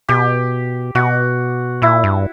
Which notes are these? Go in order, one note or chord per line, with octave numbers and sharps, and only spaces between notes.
B2 G4
B2 F#4
A#2 E4
G2